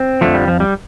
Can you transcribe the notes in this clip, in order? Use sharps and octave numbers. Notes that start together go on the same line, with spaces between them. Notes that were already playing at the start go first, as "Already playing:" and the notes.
Already playing: C4
F2 D3 F3 A3
G3
F3
G3